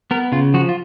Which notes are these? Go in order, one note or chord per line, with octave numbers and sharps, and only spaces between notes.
B3 A#4
C#3 F4
F3 F#4
F4